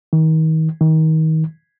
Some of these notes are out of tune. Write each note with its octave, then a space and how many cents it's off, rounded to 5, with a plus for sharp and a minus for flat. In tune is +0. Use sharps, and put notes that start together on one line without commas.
D#3 +35
D#3 +30